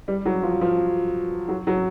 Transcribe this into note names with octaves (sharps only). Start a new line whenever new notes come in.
G3
F#3
F3
F3
F#3
F#3